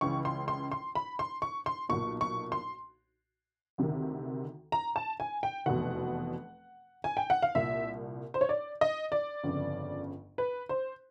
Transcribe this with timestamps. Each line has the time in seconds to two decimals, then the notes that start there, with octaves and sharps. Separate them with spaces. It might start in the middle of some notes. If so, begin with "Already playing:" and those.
0.01 C#2 C#3 E3 C#6
0.25 C6
0.48 C6
0.72 C6
0.95 B5
1.19 C6
1.42 C#6
1.66 C6
1.89 B1 A#2 C#6
2.21 C#6
2.52 C6
3.78 D2 C3 D#3
4.72 A#5
4.96 A5
5.20 G#5
5.43 G5
5.66 F1 E2 B2 F#5
7.04 G#5
7.17 G5
7.30 F#5
7.42 F5
7.55 C2 A#2 E5
8.34 C5
8.41 C#5
8.49 D5
8.81 D#5
9.12 D5
9.43 G1 F2 C#3
10.38 B4
10.69 C5